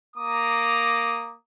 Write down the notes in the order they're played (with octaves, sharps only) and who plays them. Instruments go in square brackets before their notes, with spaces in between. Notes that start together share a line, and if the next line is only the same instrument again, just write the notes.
[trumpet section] A#3 A#5 D6 D#6